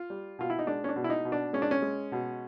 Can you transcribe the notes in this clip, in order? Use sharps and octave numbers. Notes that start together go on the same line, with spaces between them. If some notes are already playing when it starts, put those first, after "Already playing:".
Already playing: F4
G3
B2 F4
E4
D#4
G#3 D4
C#4
D4
B2
E4
D#4
B2
D4
G#3 C#4
D4
C#4
G#3
B2